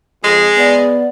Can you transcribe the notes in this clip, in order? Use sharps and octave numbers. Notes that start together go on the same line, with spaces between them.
F2 G#3 G#4
B3 D5